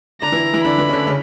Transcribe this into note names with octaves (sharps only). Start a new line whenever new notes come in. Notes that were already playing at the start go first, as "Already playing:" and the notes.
D3 D4 A#5
E3 E4
E3 E4
D3 D4 B5
E3 E4
C#4
D3 D4
C#3 C#4